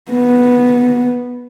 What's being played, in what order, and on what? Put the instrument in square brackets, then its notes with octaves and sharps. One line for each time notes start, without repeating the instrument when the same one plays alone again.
[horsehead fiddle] B3